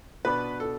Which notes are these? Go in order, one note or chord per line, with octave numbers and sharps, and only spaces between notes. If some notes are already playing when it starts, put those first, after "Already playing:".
B2 B3 D4 B4
A4